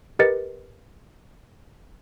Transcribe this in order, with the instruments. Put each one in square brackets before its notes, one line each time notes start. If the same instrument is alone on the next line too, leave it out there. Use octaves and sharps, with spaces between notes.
[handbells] G4 A#4 B4 D#5 A6 C#7